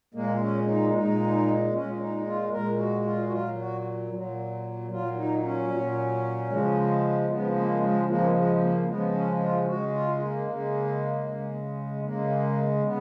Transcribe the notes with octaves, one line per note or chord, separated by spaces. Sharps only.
A#2 G#3 A#3
C#4
D#4
A#2 G#3 D#4
A#2 G#3 C#4
D#4
F4
A#2 G#3 A#4
F#4
F4
F#4
A#2 F#3 F4
F#4
A#2 F#3
A#2 F#3 F4
D#4
C#4
A#2 F#3
C#3 F3 G#3
C#3 F3 G#3 B3
A#3
G#3
C#3 F3 G#3 A#3
G#3
A#3
C#3 F3 G#3 B3
C#4
F4
C#3 G#3 F#4
F4
A#3
C#3
G#3
C#3 G#3
C#3 G#3 A#3
C#3 B3